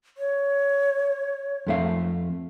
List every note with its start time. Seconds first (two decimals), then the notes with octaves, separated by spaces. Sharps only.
0.17 C#5
1.67 F2 A3 F5